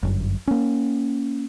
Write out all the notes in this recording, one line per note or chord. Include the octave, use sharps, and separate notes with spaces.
G1 F#2
A#3 C#4